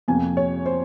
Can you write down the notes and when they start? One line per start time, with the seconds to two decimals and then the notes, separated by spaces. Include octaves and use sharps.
0.08 F2 C3 F3 A#3 G#5
0.37 C#5
0.66 C5